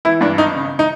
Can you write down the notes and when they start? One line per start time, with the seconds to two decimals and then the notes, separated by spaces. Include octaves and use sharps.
0.05 E3 E4
0.21 G2 D4
0.38 G#1 D#4
0.55 C#3
0.79 D#4